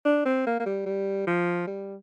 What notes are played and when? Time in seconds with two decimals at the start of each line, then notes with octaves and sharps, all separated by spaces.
0.05 D4
0.25 C4
0.47 A#3
0.60 A#3
0.66 G3
0.86 G3
1.27 F3
1.67 G3